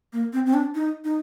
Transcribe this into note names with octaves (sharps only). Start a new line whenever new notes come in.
A#3
C4
C4
D4
D#4
D#4